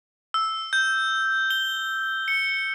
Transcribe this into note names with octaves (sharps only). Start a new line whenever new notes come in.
E6
G6
G7
C#7